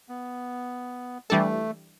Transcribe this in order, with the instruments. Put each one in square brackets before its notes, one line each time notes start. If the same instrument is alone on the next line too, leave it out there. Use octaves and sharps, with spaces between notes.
[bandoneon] B3
[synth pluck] E3 G3 D4 A4 [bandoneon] A3